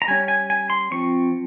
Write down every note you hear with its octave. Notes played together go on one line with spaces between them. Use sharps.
A#5
G3 C#4 G#5
G#5
G#5
C6
F3 C4 C#6